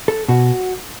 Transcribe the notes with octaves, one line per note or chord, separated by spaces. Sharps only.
A4
B2 F#4